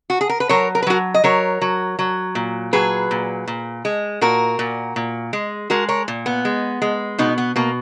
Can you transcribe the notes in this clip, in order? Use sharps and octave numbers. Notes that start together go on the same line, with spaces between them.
F#4
G#4
A#4
B4
F#3 A#4 C#5
A#4
B4
F#3 F#4 A#4
D#5
F#3 A#4 C#5
F#3
F#3
A#2
F#3 G#4 B4
A#2
A#2
G#3
A#2 F#4 A#4
A#2
A#2
G#3
G#3 F#4 A#4
A#4 C#5
A#2
B3
G#3
G#3
B2 B3 D#4
B3
B2 A#3